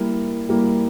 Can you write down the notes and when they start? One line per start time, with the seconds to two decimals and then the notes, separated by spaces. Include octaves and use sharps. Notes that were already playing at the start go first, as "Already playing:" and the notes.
Already playing: G3 A#3 E4 A#4
0.49 G3 A#3 E4 A#4